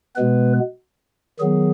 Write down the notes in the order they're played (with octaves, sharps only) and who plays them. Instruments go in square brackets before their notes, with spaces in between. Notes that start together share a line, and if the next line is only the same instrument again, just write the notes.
[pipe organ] B2 G#3 B3 B4
D#3 F#3 B3 G#4